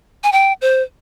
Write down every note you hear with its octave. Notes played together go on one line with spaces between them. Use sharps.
G#5
G5
C5